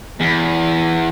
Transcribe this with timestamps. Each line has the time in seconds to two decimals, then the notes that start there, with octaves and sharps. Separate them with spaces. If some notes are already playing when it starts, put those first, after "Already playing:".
0.20 E2